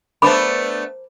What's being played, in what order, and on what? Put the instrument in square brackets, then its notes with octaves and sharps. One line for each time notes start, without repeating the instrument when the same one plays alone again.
[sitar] A3 B3 D4 [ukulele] A#4 C5 A5 [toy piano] B5 D6